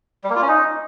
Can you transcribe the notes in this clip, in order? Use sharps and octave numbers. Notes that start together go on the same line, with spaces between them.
G3
A#3
F4
C#4
D#4